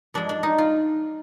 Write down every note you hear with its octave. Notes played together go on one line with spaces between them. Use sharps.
G2 F3 G#3 D4
D4
D#4
F4